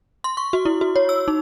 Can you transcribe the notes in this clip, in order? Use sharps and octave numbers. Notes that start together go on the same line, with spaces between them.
C6
C#6
F#4
E4
F#4
C#5
E6
D#4